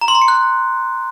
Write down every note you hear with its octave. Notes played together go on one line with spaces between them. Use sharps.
A#5
C6
A#5
C#7
F#6